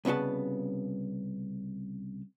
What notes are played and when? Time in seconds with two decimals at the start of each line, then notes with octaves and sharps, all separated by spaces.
0.05 C2 C#3 B3 F#4 A5